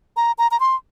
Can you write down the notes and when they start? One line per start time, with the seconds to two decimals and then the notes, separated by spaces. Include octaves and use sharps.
0.17 A#5
0.38 A#5
0.51 A#5
0.60 C6